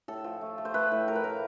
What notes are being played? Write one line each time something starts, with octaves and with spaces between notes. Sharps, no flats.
A2 A4
F3
A3
A3
C5
A3 B4
A2
F3 A#4
B4
A2 A#4